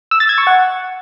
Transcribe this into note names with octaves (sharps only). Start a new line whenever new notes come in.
E6
A6
G#6
C#6
F#5